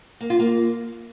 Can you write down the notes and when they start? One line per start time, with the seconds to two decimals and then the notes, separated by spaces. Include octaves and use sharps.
0.21 A#3
0.30 F4
0.39 A#3